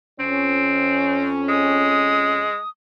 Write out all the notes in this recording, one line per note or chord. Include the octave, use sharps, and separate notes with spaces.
F2 C4 C#4
G#3 D#6